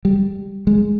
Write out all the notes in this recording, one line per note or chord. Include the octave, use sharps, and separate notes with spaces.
G3
G#3